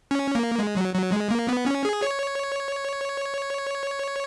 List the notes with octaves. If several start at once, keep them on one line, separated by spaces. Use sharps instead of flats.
C#4
A#3
G#3
F#3
F#3
G#3
A#3
B3
C#4
G#4
C#5